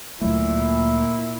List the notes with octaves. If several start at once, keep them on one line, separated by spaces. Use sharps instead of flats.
D2 A#2 F#3 A3 E4